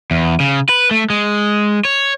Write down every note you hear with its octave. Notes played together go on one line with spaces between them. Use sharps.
E2
C#3
B4
A3
G#3
C#5